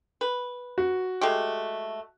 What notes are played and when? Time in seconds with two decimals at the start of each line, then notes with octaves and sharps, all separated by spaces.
0.21 B4
0.78 F#4
1.21 G#3 A3 G4